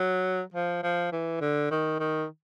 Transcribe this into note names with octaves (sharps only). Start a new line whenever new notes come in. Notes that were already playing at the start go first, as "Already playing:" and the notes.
Already playing: F#3
F3
F3
E3
D3
D#3
D#3